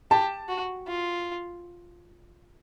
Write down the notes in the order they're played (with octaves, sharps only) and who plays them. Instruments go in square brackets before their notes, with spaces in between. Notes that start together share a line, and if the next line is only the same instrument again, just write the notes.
[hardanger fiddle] G4 [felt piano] A5
[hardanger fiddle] F#4
F4